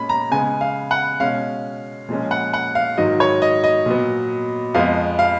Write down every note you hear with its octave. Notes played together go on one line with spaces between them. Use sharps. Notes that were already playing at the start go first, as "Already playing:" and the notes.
Already playing: A#2 G#3 C#4 B5
A#5
C#3 G#3 B3 G#5
F5
F#5
B2 G#3 C#4 F5
A#2 F3 G#3 C#4
F#5
F#5
F5
G#2 D#3 F#3 D#5
C#5
D#5
D#5
A#2 F#3 B3
F2 F3 G#3 B3 F5
F5